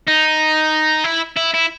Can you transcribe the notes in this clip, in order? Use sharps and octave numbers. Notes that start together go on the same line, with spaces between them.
D#4
E4
E4
E4